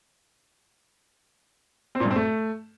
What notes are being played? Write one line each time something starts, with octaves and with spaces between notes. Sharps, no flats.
C4
A#2
G2
C4
A3